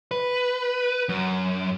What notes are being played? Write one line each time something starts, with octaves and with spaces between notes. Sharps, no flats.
B4
F#2